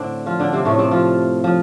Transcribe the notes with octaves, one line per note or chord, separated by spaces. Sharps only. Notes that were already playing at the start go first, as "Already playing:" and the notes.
Already playing: A2 D3 A3 C4 D4
F3 F4
D3 D4
C3 C4
A2 A3
C3 C4
F3 F4
F3